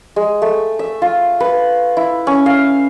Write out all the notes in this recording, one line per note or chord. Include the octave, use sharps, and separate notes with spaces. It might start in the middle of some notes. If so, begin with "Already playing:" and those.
G#3
A3
E5
F4
B4
E4
C#4
F5